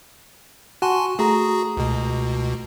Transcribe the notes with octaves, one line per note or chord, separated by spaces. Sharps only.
F#4 G#5 A5 C6 C#6
A3 F#4 G#4 A#5 D#6
C#2 B2